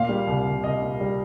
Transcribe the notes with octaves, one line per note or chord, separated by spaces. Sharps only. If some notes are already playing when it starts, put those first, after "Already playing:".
Already playing: A#2 F5
G3
C2
C2
C2 D#5
A#2
G3